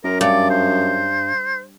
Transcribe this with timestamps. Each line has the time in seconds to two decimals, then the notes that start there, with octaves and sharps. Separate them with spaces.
0.04 F#2 A#4
0.21 G2 D5
0.50 C5